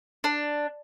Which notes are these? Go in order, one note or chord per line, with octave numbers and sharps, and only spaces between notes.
D4